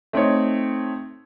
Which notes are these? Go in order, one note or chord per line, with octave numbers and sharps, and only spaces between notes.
A3 C4 D#4 C#5